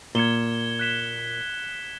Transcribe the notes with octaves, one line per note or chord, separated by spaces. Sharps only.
A#2 G#6 C#7 E7 G7
F#6 B6 E7 G7